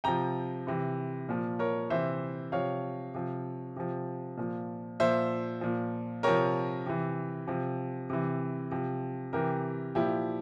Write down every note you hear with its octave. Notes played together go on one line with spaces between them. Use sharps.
C3 F3 G5 A#5
C3 E3
A#2 F3
A#4 C#5
C3 E3 C5 E5
C3 F3 C#5 F5
C3 F3
C3 F3
A#2 F3
A#2 F3 C5 E5
A#2 F3
C3 F3 A#4 C#5
C3 E3
C3 F3
C3 E3
C3 F3
C3 E3 G4 A#4
A#2 F3 E4 G4